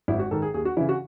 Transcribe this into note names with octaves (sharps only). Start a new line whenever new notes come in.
G#1 E4
F#4
G#2 D#3 A4
G#4
D#2 G#4
F#4
C#3 E3 E4
F#4